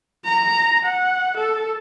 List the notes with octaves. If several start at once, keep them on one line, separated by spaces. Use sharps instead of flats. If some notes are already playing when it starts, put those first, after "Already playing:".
A#5
F#5
A4